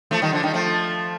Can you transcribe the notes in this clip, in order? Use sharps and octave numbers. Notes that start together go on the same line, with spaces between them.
F3 A3
D#3 G3
D3 F3
D#3 G3
F3 A3